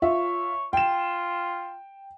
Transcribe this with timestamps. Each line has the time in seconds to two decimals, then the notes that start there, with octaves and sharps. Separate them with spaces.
0.02 F4 C#5 E5
0.73 F4 G5 E7